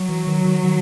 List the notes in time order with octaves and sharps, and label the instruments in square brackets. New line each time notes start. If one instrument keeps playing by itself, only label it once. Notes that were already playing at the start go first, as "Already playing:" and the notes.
Already playing: [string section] F#3
[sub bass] E3
D#3
D#3
D#3